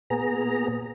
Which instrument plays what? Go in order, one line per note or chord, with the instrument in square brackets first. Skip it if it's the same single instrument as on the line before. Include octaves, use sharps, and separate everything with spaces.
[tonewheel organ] A#2 B3 G#4 A#5